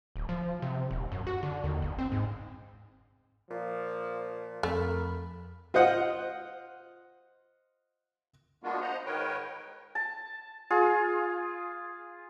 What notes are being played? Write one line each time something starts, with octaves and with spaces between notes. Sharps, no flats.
D1
F3
C3
D#1
F#2
F#4
D3
D#2
G1
C4
G#2
A#2 F3
F2 A3 A#4 B5
F4 C5 D#5 F#5
G#3 A#3 B3 D4 F4 F#4
C5 D#5 F#5 A#5
G#2 D#3 A#4 B4 C#5 G5
A5
F4 G#4